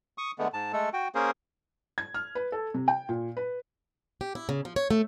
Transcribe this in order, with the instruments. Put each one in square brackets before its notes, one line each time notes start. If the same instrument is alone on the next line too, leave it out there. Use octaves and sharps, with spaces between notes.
[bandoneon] C#6 D#6
D3 G#3 A3 B3
G#2 A5
G#3 A3 A4
F#4 G5
A#3 C#4 G#4 A#4 C5
[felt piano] G#6
F6
B4
A4
C3
G5
A#2
B4
[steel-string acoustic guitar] G4
E4
C#3
F3
C#5
A3